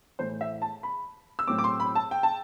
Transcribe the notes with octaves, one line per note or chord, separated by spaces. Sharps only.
A2 E3 A3 E4 C5
E5
A5
B5
E6
A2 F#3 C4 D6
D6
C6
B5
A5
G5
A5